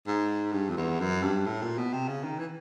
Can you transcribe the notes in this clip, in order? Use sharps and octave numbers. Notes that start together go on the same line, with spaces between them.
G#2
G2
F2
E2
F#2
G2
A2
A#2
B2
C3
C#3
D#3
E3